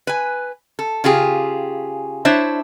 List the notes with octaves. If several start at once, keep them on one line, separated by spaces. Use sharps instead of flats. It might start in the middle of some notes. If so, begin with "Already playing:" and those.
B4 G#5
A4
C#3 F4 G4 G#4
D4 E4 C5 C#5 E5